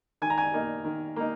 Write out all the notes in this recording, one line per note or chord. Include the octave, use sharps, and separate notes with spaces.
D#3 G#5
A#5
G#5
A#3 D#4
D#3
A#3 D#4